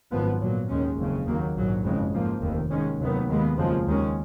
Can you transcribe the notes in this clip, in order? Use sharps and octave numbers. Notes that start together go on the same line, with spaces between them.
G#1 F#2 F3 B3
A#1 A#2 F#3
D#2 D#3 G#3 C#4
F#1 F2 C#3
D#2 D#3 F#3 A#3
A#1 G#2 F#3
F#1 F2 C#3 G#3
G#2 F3 A#3
F1 D#2 D#3
G#2 D#3 G#3 C#4
F1 D#2 D#3 F#3 B3
D#2 D#3 G#3 B3
F#1 F2 C#3 F3 G#3
D#2 D#3 G#3 C#4